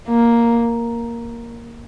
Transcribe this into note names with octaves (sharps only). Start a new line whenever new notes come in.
A#3